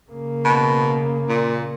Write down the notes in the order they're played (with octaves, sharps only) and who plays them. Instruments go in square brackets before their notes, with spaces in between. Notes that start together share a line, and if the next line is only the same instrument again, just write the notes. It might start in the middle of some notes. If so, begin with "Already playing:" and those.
[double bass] C#3 A#3
[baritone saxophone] B2
A#2